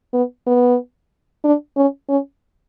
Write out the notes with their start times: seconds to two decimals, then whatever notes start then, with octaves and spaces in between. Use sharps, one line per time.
0.13 B3
0.46 B3
1.44 D4
1.77 C#4
2.09 C#4